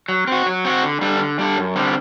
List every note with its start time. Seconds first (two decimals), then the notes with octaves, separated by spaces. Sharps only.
0.09 F#3
0.28 C4 F#4
0.46 F#3
0.65 C4 F#4
0.83 D3
1.01 G3 D4 A4
1.20 D3
1.39 G3 D4 A4
1.57 F#2
1.76 D3 G3 C4